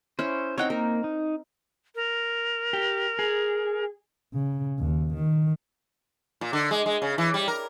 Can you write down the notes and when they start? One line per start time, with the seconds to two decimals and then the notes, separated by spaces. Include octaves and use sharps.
0.19 C#4 E4 C5
0.58 C4 D#4 C#5 F#5 G5
0.70 A#3 A#4
1.04 D#4
1.95 A#4
2.73 G4
3.19 G#4
4.34 C#3
4.79 D#2
5.14 D#3
6.41 A#2
6.53 D3
6.71 G#3
6.86 G#3
7.02 C#3
7.18 E3
7.34 G3
7.48 A#4